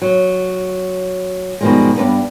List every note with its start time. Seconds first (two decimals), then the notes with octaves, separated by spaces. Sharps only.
0.02 F#3
1.61 G#2 B2 D#3 F3 G3 G#3
1.96 G2 B3 C#4 D4